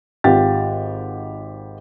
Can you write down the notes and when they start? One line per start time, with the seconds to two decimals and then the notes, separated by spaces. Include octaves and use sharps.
0.24 G#1 F4 G4 F#5 A6